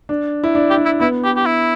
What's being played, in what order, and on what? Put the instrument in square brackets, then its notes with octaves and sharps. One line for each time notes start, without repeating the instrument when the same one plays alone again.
[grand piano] D4
E4
D4
[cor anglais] G4
[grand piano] D4
[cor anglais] E4
[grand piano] B3 [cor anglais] E4
[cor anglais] G4
G4
E4